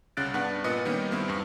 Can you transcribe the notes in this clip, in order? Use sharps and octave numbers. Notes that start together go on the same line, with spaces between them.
C2 C#3 C#4 F#6 A6 D7
G2 B3 D4 F#5
A#2 B3 B4 D#5 C#7
D#3 G3 A#3 B3 C#4
G2 D#3 B3 C4 E4
E2 G2